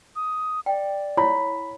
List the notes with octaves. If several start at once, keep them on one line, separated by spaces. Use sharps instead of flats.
D#6
D5 G5
E4 C#5 B5